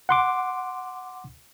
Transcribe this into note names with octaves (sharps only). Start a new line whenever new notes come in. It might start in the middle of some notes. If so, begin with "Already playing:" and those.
F#5 C6 D6